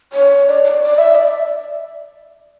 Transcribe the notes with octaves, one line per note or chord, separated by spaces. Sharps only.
C#5
D5
D5
D5
E5
D5